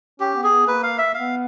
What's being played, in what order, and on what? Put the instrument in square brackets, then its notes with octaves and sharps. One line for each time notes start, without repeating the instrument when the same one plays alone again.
[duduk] C#4 [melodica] G4
[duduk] B3
[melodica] G#4
[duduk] B3
[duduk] A#3 [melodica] B4
[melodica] F5
E5
[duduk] B3 [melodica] F5